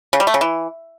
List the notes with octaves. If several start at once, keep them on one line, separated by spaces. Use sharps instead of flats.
C#3
G3
A3
C#3
E3